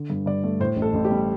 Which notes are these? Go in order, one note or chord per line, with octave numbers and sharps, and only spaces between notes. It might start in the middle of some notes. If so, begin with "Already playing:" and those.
Already playing: D3
G2
G2 D5
A3
A2 C5
A1
A4
A1
G4
G3